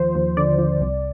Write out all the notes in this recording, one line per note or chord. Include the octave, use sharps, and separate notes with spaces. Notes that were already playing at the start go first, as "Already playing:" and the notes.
Already playing: D#2 F3 C5
D#2
D3 D5
F3
C2